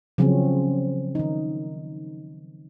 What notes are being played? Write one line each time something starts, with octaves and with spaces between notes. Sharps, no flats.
C#3 F3 F#3 C4 C#4
D#3 D#4